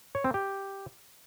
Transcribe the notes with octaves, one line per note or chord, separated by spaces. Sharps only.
C#5
C4
G4